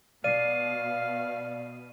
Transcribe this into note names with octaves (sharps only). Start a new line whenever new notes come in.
B2 D5 F5 C7 D#7